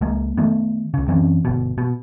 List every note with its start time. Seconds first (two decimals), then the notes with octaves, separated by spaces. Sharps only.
0.01 C#2 G#3 A#3
0.37 D#3 A3 B3
0.94 C#2 C#3
1.08 F#2 E3 C4 C#4
1.45 G1 B2
1.78 B2